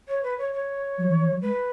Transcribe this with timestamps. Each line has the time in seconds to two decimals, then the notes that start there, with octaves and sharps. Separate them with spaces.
0.08 C#5
0.23 B4
0.38 C#5
0.53 C#5
0.98 F#3
1.09 E3
1.19 E3
1.31 F#3
1.41 G#3 B4